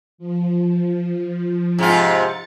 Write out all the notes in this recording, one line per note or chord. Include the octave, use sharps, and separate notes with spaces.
F3
G#2 C3 F4 A6 C#7